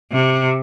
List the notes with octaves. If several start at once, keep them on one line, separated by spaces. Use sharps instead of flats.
C3